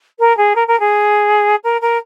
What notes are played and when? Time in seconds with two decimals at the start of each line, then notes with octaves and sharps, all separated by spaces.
0.19 A#4
0.37 G#4
0.55 A#4
0.67 A#4
0.80 G#4
1.64 A#4
1.81 A#4